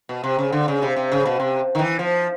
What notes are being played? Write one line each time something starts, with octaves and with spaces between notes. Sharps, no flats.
B2
C3
C#3
D3
C#3
C3
C3
C#3
B2
C3
D#3
E3
F3